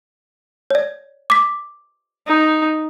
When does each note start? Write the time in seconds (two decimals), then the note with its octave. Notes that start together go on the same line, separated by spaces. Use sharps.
0.71 C#5 D5
1.30 D6 B6
2.27 D#4